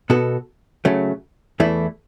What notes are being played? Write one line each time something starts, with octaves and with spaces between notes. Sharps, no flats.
B2 B3 F#4 A4
C#3 F#3 A3
E2 E3 A3 E4